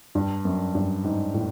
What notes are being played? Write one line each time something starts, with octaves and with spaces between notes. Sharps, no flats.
G2
F#2
G2
G#2
A2